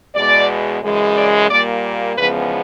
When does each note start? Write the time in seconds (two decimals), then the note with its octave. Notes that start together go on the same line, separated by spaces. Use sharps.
0.15 E2 B2 G#3 D5
0.82 F#2 C#3 E3 G#3
1.16 D5
1.49 A#2 G3 A#3 D5
2.17 E2 C#3 F3 G#3 B3 B4